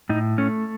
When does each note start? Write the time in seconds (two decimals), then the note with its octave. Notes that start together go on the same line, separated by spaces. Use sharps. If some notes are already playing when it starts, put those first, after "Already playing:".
0.09 A2 D#4
0.38 A3 C#4